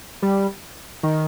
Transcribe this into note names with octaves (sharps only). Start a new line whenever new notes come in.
G3
D#3